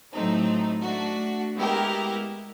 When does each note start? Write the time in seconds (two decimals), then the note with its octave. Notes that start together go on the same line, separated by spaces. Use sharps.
0.12 A2 F#3 A3 C4 D#4
0.83 A3 D4 F#4
1.56 G#3 B3 E4 G4 A#4